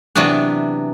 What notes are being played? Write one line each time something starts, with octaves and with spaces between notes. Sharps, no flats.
C3 E3 F#3 B3 D4